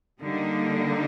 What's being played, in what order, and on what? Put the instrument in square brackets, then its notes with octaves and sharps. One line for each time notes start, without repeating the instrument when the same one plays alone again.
[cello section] D3 G3 A#3 D#4